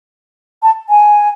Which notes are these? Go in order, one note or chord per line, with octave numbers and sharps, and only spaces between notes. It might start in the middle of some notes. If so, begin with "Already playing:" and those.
A5
G#5